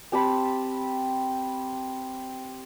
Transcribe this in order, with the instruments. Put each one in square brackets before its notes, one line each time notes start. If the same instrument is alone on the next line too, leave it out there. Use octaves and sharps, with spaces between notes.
[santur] C4 G4 A5 B5